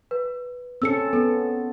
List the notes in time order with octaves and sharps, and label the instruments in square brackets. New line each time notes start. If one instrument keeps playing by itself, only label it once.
[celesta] B4
[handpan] C4 C#4 A4 [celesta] E6 C#7
[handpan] B3 [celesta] A4